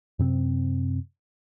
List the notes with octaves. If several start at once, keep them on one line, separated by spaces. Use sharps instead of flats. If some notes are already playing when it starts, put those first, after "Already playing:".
F#2 C3 C4